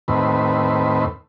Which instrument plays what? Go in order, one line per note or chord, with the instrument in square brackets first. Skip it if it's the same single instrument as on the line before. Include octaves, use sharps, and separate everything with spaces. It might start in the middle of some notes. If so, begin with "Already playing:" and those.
[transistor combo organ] D#2 A2 C4 B4